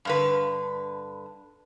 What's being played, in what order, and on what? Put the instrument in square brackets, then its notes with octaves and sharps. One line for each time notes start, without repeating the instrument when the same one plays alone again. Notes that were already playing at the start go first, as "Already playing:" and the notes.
[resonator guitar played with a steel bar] G2 D3 B4